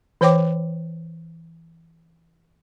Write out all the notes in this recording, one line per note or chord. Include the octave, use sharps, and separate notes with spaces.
E3 C5 C#5 G5 D6